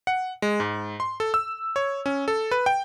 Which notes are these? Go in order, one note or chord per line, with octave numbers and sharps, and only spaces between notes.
F#5
G#3
G#2
C6
A4
E6
C#5
C#4
A4
B4
G5